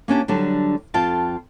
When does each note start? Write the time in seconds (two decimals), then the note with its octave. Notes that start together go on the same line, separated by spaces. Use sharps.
0.08 A#3 C#4 D4 G4
0.28 D3 F#3 G3 D4
0.94 F2 F4 G5 A5